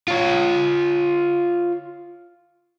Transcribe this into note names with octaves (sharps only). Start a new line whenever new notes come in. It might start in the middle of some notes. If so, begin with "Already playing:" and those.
F4 C#5